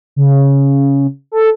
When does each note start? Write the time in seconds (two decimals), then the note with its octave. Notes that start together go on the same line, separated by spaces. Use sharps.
0.16 C#3
1.32 A4